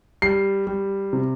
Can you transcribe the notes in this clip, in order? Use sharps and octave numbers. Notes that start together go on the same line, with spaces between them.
G3 C7
G3
C3